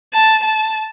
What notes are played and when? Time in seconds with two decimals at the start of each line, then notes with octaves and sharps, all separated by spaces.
0.14 A5
0.43 A5